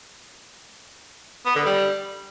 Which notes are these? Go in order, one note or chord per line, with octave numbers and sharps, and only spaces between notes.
B3
D3
G3